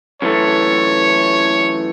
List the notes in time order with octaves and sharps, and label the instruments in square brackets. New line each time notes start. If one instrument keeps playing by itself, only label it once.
[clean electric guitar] F#2 E3 A3 [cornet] C#5